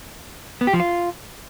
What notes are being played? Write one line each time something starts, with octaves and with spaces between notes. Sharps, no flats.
B3
G4
F3
F4